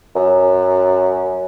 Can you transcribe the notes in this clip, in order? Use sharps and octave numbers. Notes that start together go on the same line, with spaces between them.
F#2